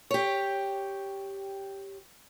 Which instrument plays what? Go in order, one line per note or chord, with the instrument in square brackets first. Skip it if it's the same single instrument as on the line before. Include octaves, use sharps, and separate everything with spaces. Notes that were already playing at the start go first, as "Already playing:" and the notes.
[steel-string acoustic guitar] G4 C#5